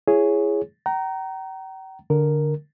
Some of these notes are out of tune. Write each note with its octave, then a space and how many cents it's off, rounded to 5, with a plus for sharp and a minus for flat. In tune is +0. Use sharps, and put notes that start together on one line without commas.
E4 +30 G#4 +0 C#5 +0
G5 -45 A#5 +0
D3 +0 A#4 +0